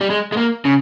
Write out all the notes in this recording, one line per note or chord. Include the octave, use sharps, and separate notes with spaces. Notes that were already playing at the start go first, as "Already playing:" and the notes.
G3
G#3
G#3
A#3
C#3